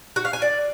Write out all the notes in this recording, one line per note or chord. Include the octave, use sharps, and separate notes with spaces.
F#4
F5
G#5
D5